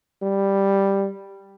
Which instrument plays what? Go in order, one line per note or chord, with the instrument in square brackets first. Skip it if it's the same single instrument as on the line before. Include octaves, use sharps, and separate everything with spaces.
[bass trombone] G3